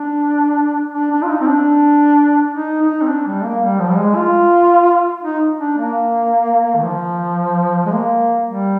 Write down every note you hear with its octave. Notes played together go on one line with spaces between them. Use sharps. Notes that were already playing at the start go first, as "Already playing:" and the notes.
Already playing: D4
D4
D4
F4
D#4
C4
D4
D#4
D#4
C4
D4
G3
A#3
G3
F3
G3
G#3
F4
D#4
D4
A#3
D#3
F3
G#3
A#3
G3